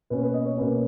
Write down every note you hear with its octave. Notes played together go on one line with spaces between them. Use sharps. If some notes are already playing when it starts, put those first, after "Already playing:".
B2 A#3 C#4 B4
B4
D#5
C#5
B2 A#3 C#4 B4